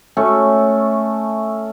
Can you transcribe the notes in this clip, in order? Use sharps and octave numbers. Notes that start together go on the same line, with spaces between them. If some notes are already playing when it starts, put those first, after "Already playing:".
A3 C#4 A4 E5